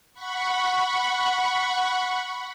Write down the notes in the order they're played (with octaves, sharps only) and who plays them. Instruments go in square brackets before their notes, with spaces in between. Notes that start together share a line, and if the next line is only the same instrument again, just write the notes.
[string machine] F#5 B5 C#6